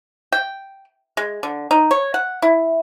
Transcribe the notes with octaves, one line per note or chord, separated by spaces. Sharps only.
G5
G#3
D3
D#4
C#5
F#5
E4